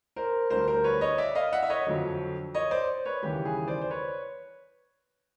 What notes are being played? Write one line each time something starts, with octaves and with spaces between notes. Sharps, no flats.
A#4 C5
D2 D3 G3 A#4 C5
A#4 C5
B4 C#5
C#5 D#5
D5 E5
D#5 F5
E5 F#5
E5
C#5 D#5
F2 D3 F#3
C#5 D#5
C5 D5
B4 C#5
D#2 C#3 E3 G3 G4
G#4
C5 D5
C5
B4 C#5